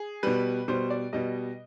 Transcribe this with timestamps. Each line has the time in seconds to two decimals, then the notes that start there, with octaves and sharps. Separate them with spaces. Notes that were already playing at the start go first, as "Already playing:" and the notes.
Already playing: G#4
0.23 B2 G3 B4
0.68 B2 G3 C5
0.90 D5
1.13 B2 G3 D#5